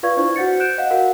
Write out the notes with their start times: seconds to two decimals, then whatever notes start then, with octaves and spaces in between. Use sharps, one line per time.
0.03 F4 B4 D5 F5 C#6 G#6
0.17 D4 E4 C5 C#6
0.36 F#4 C5 F#5 G6 A6 C#7
0.60 F#6 G6 D7 E7
0.78 D#5 F5 F#5
0.90 F#4 A#4 F5 F#5